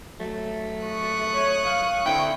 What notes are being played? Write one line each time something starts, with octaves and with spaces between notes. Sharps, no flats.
F#3 A3
C#6 D#6 F#6
C#5
F5
D3 C4 E4 G5